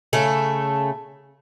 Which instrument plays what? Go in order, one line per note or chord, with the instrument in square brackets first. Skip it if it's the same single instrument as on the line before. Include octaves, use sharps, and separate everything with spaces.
[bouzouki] C#3 A3 A4